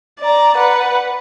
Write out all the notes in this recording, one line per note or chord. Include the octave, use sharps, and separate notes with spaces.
D5 A#5
B4 F#5